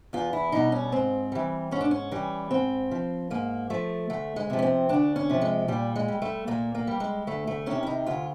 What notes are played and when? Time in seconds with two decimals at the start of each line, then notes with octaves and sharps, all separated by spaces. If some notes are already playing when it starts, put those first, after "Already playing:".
0.13 E2 F4
0.33 E4
0.52 B2 G3 D#4
0.72 C#4
0.92 G#2 C4
1.32 E3 G3
1.71 G#2 C#4
1.81 D4
1.91 C#4
2.12 E3 G3
2.51 G#2 C4
2.91 F3
3.30 G#2 A#3
3.70 F3 A3
4.10 D2 A3
4.36 G#3
4.50 C3 F3
4.59 C#4
4.62 C4
4.89 D2 D4
5.16 C#4
5.29 C3 F3
5.41 G#3
5.68 A#2 G3
5.96 G#3
6.08 G3
6.22 A3
6.47 A#2 A#3
6.75 A#3
6.87 G3
7.00 G#3
7.27 D2 A3
7.47 A3
7.66 C3 D#3 C#4
7.83 E4
7.87 D#4
8.06 D2 F4